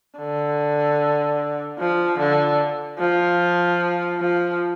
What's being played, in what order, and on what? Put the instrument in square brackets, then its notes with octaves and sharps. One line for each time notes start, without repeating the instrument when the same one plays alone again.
[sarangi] D3
F3
D3
F3
F3